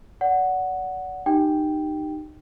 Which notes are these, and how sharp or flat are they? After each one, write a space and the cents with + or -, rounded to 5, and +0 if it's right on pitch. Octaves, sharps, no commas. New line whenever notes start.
D5 -35 F#5 +0
D#4 -25 G4 -15 G5 +0